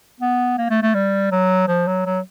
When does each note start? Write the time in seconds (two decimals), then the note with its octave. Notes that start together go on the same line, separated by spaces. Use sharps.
0.20 B3
0.58 A#3
0.70 A3
0.82 A3
0.95 G3
1.32 F#3
1.68 F3
1.87 F#3
2.06 F#3